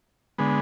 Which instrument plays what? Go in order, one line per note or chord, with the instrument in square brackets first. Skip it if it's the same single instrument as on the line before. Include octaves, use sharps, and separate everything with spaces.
[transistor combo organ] D3 G#3 B3